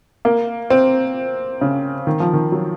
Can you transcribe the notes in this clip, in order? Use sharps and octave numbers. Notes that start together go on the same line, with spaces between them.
A#3
C4
C#3
D#3
F3
D#3
F#3